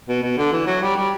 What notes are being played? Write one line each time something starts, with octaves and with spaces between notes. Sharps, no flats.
B2
B2
D3
E3
F#3
G3
G3